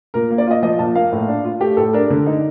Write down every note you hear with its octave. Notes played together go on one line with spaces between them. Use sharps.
A#2 A#4
A#3
D5
F4 D#5
F3 D#5
A#2 A5
A#3 F5
A2
D4
F4
A3 G4
A2 A4
D4 A#4
D3
D#4